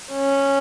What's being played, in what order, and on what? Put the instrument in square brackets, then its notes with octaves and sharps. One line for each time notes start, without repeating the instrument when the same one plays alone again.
[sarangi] C#4